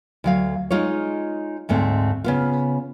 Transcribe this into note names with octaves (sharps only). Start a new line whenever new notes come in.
D2 F#3 F5
G#3 D#4 F4 G#4 C#5
D2 G#2 A3 C4
C#3 B3 F4